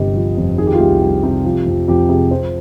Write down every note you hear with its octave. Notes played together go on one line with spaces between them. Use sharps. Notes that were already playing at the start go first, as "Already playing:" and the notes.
Already playing: G1 C3 G4 D#5
F3
F2
D#3 G#4
G4
F4
C2 G4
G3
C3
F3
F2
F2 G4
C3 G#4
F3 C5